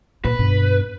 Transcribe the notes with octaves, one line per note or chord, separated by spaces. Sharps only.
A#2 B4
G2 B2